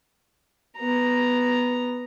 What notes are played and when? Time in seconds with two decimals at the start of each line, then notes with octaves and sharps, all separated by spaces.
0.77 B3 A#5